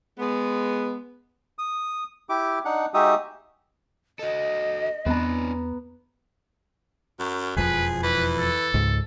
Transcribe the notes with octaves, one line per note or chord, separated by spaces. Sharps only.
G#3 B3
D#6
E4 G4 D6
D4 D#4 F#5
G#3 D#4 F#4 G4 E5 D#6
F#4 A4 D#5
E2 B3 C4 D4 A#5
F#2
E1 F2 F3 G#4 B4
E3 B4
A4
C#2 G#2